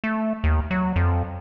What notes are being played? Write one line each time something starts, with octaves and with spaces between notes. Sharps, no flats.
A3
D#2
F#3
F2